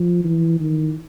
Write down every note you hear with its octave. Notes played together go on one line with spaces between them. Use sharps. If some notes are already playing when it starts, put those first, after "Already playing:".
Already playing: F3
E3
D#3